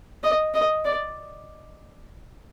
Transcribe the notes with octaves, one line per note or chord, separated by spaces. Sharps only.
D#5
D#5
D5